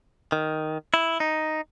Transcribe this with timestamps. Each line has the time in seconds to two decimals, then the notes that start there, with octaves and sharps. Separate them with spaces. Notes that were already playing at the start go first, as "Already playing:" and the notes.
0.32 D#3
0.94 E4
1.20 D#4